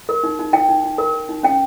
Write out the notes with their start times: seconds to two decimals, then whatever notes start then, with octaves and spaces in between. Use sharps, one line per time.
0.09 A#4
0.23 D#4
0.39 D#4
0.53 D#4 G5
0.69 D#4
0.84 D#4
0.98 A#4
1.14 A#4
1.29 D#4
1.43 C#4 G5